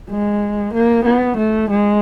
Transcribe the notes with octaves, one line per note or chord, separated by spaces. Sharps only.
G#3
A#3
B3
A3
G#3